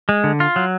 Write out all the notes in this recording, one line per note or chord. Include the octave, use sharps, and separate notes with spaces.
G#3
D3
F4
F#3